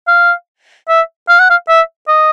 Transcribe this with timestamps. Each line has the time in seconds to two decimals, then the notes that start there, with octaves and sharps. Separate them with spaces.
0.08 F5
0.89 E5
1.29 F5
1.39 F#5
1.50 F5
1.68 E5
2.08 D#5